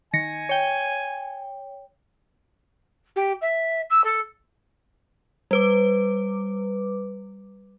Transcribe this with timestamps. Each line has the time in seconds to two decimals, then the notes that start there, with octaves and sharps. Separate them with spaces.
0.13 D#3 G#5 A#6 C#7
0.49 C#5 G5
3.16 G4
3.41 E5
3.90 E6
4.04 A4
5.51 G3 B4 D6